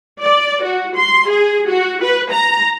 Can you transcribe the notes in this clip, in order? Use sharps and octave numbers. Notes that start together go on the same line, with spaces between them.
D5
F#4
C6
G#4
F#4
B4
A#5